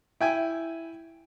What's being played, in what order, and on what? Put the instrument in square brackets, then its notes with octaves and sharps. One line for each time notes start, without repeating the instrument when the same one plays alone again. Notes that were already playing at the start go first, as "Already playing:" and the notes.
[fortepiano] E4 G5 G#5